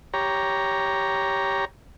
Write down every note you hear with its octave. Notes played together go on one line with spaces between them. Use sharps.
G4 C#5 A#5